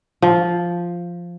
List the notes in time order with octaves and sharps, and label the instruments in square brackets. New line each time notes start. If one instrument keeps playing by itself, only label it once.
[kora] F3